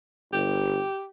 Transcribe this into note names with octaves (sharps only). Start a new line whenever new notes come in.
G1 G4